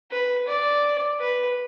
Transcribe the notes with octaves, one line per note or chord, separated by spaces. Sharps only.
B4
D5
B4